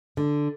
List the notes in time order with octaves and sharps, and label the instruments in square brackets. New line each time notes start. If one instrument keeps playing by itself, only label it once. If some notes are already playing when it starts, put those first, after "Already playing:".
[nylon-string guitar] D3